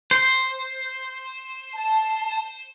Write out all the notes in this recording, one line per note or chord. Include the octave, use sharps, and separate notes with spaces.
C5
A5